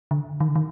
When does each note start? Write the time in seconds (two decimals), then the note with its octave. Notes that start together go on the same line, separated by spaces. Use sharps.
0.11 D3
0.40 D#3
0.48 D3
0.56 D#3